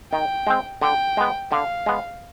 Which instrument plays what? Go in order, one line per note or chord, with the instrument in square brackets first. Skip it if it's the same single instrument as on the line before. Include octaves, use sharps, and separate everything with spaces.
[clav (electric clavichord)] D#3 [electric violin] G5
[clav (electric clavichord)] G#3 C4
[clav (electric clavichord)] D3 [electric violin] G5
[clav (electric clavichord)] G#3 B3
[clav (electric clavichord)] D3 [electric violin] F5
[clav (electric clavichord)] G#3 B3